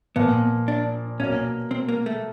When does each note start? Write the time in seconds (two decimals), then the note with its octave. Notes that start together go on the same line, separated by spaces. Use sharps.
0.16 A#2 F3 A#3 B3
0.68 D4
1.20 B2 F#3 A#3 C#4
1.71 C4
1.89 A#3
2.06 A3